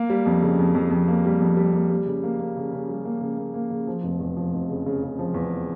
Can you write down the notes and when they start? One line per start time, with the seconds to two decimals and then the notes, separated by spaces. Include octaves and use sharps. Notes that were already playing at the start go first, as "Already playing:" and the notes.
Already playing: A#3
0.10 G3
0.26 F2
0.42 C#3
0.59 F2
0.75 F2
0.91 F2
1.08 A#3
1.25 G3
1.41 F2
1.57 G3
1.73 A#3
1.90 G3
2.06 C#3
2.23 A#3
2.39 A#3
2.56 C#3
2.73 C#3
2.89 G3
3.05 A#3
3.21 C#3
3.37 A#3
3.54 A#3
3.70 C#3
3.87 F3
4.03 F1
4.19 E2
4.37 F3
4.53 F1
4.70 C#3
4.86 C#3
5.03 C#3
5.19 F3
5.34 E2